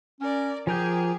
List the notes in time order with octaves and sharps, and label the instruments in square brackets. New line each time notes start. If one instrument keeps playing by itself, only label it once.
[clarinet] C#4 [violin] A#4 D5
[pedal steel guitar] F3 A#4 G6 [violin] G4 G#4 [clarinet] G#5